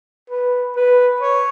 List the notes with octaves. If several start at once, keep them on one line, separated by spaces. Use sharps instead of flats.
B4
B4
C#5